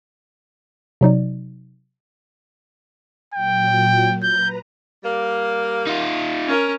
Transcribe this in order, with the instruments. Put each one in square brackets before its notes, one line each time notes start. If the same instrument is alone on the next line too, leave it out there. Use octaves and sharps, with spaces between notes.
[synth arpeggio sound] C3 F#3 D#4 D5
[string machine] A#2 F#3 [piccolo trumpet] G5
[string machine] B4 A#5 [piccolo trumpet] G6
[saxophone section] G3 A#3
[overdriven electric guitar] D#4 F4
[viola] C#4 A#4